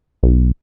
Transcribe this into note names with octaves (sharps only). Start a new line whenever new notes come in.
B1